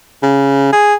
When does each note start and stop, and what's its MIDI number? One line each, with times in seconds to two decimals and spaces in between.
0.23 0.68 49
0.72 0.95 68